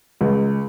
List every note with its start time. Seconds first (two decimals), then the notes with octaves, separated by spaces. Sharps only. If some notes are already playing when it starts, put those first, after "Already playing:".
0.21 C#2